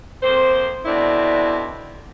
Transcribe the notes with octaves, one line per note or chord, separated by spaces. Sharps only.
F2 A#3 C5
B2 D3 C4 D4 E4